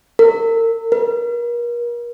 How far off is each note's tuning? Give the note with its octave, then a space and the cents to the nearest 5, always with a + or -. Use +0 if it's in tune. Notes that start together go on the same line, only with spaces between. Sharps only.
A#4 -35
A#4 +40